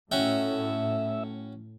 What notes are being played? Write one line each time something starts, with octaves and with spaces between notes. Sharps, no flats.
A2 C#4 F#4 E5 G5